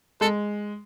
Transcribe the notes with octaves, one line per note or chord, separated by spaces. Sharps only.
G#3 A4